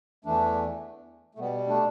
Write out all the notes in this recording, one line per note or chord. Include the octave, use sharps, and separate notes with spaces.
E2 E3 A3 D4
A3
B2 G3 B3
A3 D4